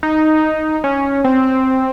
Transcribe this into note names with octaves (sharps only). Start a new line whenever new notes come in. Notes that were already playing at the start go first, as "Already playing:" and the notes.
D#4
C#4
C4